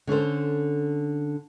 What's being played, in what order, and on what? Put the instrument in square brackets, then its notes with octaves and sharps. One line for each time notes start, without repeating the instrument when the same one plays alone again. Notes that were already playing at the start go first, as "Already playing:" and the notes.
[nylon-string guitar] D3 C#4 A4 C5